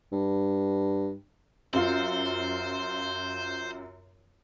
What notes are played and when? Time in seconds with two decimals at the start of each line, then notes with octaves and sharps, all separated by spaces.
0.12 G2
1.73 F#2 F4 C5